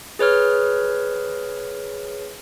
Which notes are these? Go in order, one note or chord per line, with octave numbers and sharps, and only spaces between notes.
G#4 B4 C#5 F6